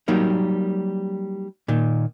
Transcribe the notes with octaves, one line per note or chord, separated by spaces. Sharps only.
F#3 G3 A#3 D#4 A#4
A#2 D#3